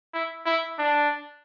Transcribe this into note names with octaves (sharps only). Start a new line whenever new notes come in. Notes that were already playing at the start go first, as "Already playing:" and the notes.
E4
E4
D4